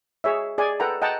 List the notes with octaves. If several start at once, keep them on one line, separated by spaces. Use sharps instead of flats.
G#4 C#5 E5
G#4 D5 G#5
A4 B4 F#5 G5 A#5
D#5 F#5 G5 A5 A#5